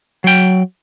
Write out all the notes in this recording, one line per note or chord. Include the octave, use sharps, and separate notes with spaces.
F#3 G5